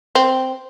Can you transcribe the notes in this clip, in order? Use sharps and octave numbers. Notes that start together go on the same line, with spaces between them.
C4